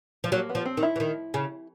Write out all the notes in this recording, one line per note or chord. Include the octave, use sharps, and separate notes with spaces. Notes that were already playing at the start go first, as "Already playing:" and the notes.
F3
F#3 A#3
B3
F3
C4
D#3
E4
E3
D#3
C#3